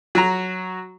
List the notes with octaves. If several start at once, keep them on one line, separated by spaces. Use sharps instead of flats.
F#3 F#4 A#5